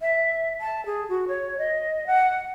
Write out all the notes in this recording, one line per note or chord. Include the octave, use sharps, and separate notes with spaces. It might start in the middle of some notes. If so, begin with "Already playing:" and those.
E5
A5
G#4
F#4
C#5
D#5
F#5